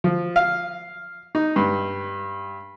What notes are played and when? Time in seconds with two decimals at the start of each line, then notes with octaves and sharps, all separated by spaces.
0.04 F3
0.36 F5
1.35 D#4
1.56 G2